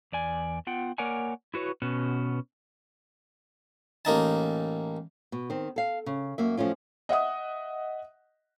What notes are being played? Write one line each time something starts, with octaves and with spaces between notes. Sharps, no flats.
E2 D5 G#5
B3 F4 F#5 G5
A#3 A#4 C#5 D5 F#5 G#5
E4 F#4 B4 C#5
B2 B3 C#4 F#4
A1 A#3 D#4 A5
B2
D#3 C4
A4 F5
C#3
F#2 A#3 E5
F#2 F3 A3 C#4 F4
D#5 E5 F#5 D#6